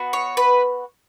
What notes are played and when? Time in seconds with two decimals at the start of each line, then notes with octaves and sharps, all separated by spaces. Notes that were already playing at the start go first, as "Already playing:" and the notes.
Already playing: B3 F#4
0.13 C#5
0.37 B4